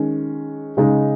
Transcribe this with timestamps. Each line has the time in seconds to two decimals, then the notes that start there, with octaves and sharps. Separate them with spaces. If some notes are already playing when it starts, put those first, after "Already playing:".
Already playing: D#3 G#3 C#4
0.77 C#3 G#3 D#4